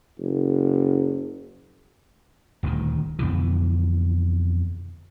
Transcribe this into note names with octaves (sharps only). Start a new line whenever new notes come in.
F#1
D#1 D2 A#2 D#3
F2 B2 D3 E3